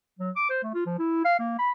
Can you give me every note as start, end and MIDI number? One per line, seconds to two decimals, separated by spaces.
0.19 0.30 54
0.36 0.50 86
0.50 0.59 72
0.63 0.72 57
0.74 0.82 65
0.86 0.97 53
0.99 1.20 64
1.25 1.36 77
1.39 1.54 58
1.59 1.71 83